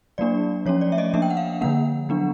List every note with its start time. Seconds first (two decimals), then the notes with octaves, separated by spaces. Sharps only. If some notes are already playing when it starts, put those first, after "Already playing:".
0.18 F#3 A#3 D4 D5
0.66 F3 A3 C#4 C#5
0.81 D5
0.92 E5
0.98 D#5
1.14 F3 A#3 D4 E5
1.22 G5
1.30 F#5
1.37 F5
1.61 D3 F3 A#3 F#5
2.09 F#3 B3 D4